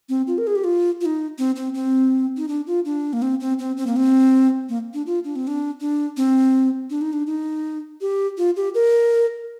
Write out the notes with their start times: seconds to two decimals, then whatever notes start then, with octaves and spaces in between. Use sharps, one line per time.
0.09 C4
0.27 F4
0.38 A#4
0.47 G#4
0.56 G4
0.64 F4
1.01 F4
1.06 D#4
1.38 C4
1.56 C4
1.74 C4
2.37 D#4
2.48 D4
2.67 F4
2.85 D4
3.13 A#3
3.22 C4
3.40 C4
3.59 C4
3.77 C4
3.87 A#3
3.96 C4
4.69 A#3
4.94 D4
5.06 F4
5.24 D4
5.36 C4
5.47 D4
5.80 D4
6.17 C4
6.90 D4
7.01 D#4
7.13 D4
7.27 D#4
8.01 G4
8.38 F4
8.56 G4
8.74 A#4